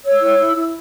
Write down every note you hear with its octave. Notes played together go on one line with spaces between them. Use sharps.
C#5 E6
E4
E4
E4